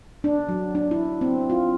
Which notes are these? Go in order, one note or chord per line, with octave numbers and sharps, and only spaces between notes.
D4
F#3
D4
E4
C4
F4